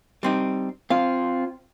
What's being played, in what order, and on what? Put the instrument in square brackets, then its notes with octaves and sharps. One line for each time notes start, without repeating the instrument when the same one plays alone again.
[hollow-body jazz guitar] G3 C4 D#4
[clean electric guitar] C4 F4 [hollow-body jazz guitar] F5